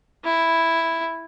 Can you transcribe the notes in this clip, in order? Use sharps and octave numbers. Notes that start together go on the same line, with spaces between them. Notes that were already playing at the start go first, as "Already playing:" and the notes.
E4